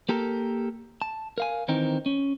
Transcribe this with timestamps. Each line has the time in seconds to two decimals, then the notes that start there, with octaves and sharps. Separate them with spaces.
0.09 A#3 G4 A4 A#4
1.02 A5
1.38 A#4 F5 G#5
1.68 D#3 E3 C4 D#4 A#4 G5
2.06 C#4